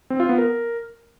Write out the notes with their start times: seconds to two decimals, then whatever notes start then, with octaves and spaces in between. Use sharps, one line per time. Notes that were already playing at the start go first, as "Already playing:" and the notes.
0.10 C4
0.20 F4
0.29 B3
0.38 A#4